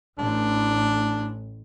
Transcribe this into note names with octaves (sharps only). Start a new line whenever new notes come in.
A1 D4